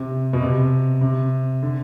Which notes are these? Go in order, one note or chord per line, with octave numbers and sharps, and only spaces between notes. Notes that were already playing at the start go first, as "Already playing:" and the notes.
Already playing: C3
B2
C3
C3
D3